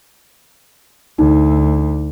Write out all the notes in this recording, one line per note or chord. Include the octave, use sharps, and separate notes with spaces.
D2 D#4